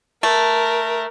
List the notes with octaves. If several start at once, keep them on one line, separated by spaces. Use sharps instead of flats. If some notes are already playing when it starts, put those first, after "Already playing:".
A3 A#4